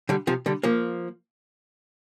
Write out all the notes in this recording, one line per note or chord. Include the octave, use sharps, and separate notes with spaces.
D3 G3
C3 F3
D3 G3
F3 A#3